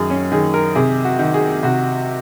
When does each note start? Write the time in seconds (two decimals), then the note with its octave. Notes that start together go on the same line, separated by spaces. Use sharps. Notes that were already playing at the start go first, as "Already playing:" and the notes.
Already playing: F#2 D#3 G#4
0.10 C#4
0.32 D#3 G#4
0.54 A#4
0.75 C3 G#4
1.04 F#4
1.19 D#3
1.34 G#4
1.63 C3 F#4